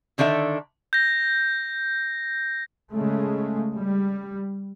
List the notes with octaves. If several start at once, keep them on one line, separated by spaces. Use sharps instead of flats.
D3 D#3 D4 A4 E5
G6 A#6
C#3 G#3 A3
G3